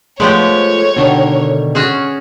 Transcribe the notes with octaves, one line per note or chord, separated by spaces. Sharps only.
F3 G#3 A3 B3 G4 C#5
B2 D3 D#3
C#4 F#4 G#4